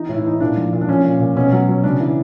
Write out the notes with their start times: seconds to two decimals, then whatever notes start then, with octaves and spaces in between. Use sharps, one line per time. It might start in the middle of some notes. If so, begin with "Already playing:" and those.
Already playing: E3 D#4
0.09 A2
0.14 E4
0.24 E3 D#4
0.40 A#2 D4
0.57 F3
0.73 A#2
0.81 D4
0.89 F3 C#4
1.04 A#2
1.19 A#2
1.36 B2 C#4
1.52 F#3
1.68 F#3
1.83 C#3 D4
2.00 E3